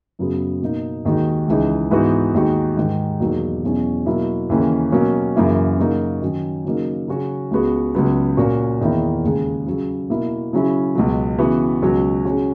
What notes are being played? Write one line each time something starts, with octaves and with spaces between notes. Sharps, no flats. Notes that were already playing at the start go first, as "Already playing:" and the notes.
F#2 C#3 F#3 B3 F#4
B2 A#3 D#4
D#2 D#3 G#3 D#4 F#4
C#2 C#3 E3 G#3 D#4
G#2 E3 B3 D#4 F#4
D#2 D#3 G#3 D#4 F#4
G#2 D#3 G#3
E2 B2 F#3 A#3 D#4
E2 B2 F#3 C#4 E4
B2 F#3 A#3 E4
D#2 C#3 E3 A#3 C#4
B2 F#3 A#3 C#4
F#2 C#3 E3 A#3 E4
C#3 F#3 A#3 D#4 F#4
D#3 F#3 C#4
C#3 F#3 A#3 D#4
C#3 F#3 C#4 F#4
C#2 C#3 G#3 B3 F#4
C#2 C#3 F#3 B3
A#2 A#3 C#4 F#4
E2 D#3 A#3 E4
D#2 C#3 G#3
C#3 F#3 C#4
B2 A#3 E4
C#3 F#3 C#4 E4
C#2 B2 F#3
C#3 E3 B3 F#4
C#2 B2 F#3 C#4 F#4
C#3 G#3 C#4 F#4